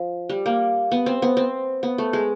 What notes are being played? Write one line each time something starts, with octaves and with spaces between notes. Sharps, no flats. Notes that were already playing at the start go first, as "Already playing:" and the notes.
Already playing: F3
G3
A#3
B3
C4
B3
C4
B3
A3
G#3